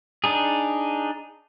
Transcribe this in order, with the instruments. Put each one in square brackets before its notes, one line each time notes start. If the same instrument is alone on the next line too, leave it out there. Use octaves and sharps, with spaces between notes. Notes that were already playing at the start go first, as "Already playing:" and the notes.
[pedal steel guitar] D4 D#4 G#4